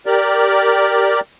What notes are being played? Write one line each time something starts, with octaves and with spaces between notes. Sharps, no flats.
G4 A#4 D5